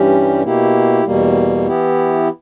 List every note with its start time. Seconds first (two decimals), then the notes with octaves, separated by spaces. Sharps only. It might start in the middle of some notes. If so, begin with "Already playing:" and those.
Already playing: G2 E3 G3 C#4 G4
0.42 B2 A#3 E4 G4
1.05 E2 B2 G3 A#3
1.66 E3 B3 E4 G4